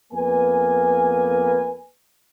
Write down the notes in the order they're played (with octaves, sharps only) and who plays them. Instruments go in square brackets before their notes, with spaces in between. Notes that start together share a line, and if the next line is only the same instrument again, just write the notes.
[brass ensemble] F2 A#3 B3 B4 G#5